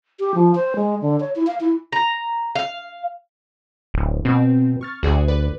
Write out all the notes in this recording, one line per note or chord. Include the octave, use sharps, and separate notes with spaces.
G4
F3
C5
G#3
D3
C#5
E4
F5
E4
A#5
F5
D1
B2 C4
C#6 F6 A6
D2 F#4 G#4 D5
B4 D5